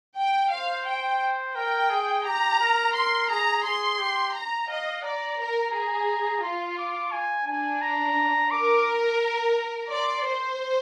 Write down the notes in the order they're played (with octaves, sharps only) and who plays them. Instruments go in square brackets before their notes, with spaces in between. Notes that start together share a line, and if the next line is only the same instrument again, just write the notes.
[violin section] G5
[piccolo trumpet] C5 [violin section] F5
[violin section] G5
[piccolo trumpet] A#4 [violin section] G5
[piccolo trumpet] G#4
[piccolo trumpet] G4 [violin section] A#5
[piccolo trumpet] A#4
[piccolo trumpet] A#4 [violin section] C6
[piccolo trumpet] G#4 [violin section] A#5
[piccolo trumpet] G#4 [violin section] C6
[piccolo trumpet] G4
[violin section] A#5
[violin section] D#5 [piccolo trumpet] F5
[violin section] D5 [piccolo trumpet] A#5
[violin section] A#4
G#4
[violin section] F4 [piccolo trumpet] C6
[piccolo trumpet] D6
G#5
[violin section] D4 [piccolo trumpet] G#5
[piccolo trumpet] A#5
[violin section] A#4 [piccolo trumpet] D6
[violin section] D5 [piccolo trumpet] C6
[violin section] C5